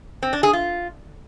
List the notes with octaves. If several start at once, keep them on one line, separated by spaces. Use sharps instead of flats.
C4
D4
G#4
F4